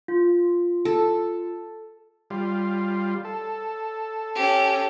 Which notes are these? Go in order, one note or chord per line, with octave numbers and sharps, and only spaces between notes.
F4
A4
G3 F4
A4
C#4 G4